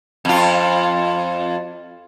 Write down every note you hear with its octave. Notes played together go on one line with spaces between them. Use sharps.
F2 F4